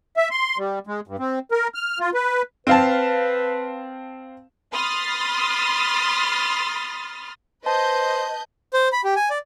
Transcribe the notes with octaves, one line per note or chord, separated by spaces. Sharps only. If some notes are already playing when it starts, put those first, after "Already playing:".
E5
C6
G3
G#3
G2
C4
A#4
F6
F4
B4
C4 B4 F5 A5
B5 C6 D#6 F6 A6
B4 C5 D#5 A5 G6
C5
B5
G4
G#5
D5